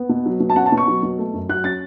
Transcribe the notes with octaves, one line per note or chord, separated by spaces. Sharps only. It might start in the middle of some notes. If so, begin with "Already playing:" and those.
Already playing: B3
B2
F#3
B2
A5
C#4 F#5
A5
B2
C#6
F#3
B2
A3
F#2
F#3 F#6
C#4 A6